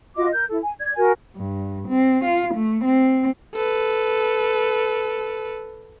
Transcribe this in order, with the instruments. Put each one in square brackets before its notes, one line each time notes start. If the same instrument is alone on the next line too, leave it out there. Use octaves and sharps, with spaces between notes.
[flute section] F4 F#4 D#5 D6
A#4 G6
E4 A4
G#5
D5 G#6
F#4 A#4 G#5
[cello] G2
C4
F4
A3
C4
[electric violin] A4 B4